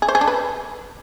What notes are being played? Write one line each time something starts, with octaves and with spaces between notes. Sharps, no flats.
G#4
C5
G#4
D4
B4